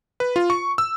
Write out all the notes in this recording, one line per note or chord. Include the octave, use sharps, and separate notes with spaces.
B4
F4
C#6
E6